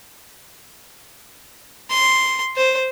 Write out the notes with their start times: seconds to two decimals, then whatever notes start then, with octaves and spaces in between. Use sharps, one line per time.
1.90 C6
2.56 C5